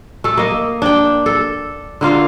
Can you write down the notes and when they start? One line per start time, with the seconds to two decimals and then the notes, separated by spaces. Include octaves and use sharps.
0.24 A3 A4
0.37 A#3 D#5
0.82 D4 G5
1.26 A4
2.01 D3 A#3 F4 F5